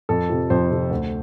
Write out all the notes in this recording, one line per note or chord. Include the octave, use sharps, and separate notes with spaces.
F2 A4
C3 F3
F2 C5
C3 F3
D2